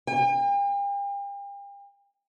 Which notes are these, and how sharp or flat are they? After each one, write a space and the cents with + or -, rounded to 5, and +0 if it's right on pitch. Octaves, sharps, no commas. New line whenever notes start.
G5 +40